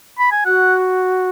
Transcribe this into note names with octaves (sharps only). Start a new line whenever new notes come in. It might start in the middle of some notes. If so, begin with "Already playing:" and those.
B5
G#5
F#4 F#5